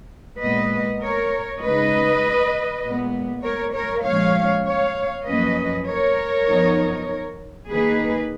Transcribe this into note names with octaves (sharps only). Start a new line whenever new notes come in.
A#2 G#3 B3 B4 D#5
A#4 C#5
C#3 G#3 D#4 B4 D#5
A#2 G#3 B3
A#4 C#5
A#4 C#5
A#2 F3 G#3 C#4 C#5 F5
C#5 F5
F#2 F3 A#3 C#4 B4 D#5
A#4 C#5
F#2 F3 B3 D#4
D#3 A#3 D#4 G#4 B4